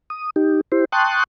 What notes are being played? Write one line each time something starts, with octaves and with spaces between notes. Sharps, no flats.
D#6
D#4 G4
E4 G4 C5
G5 A5 C6 C#6 D#6 F#6